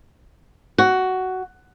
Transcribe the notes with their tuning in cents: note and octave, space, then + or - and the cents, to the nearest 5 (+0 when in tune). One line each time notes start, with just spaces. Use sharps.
F#4 +10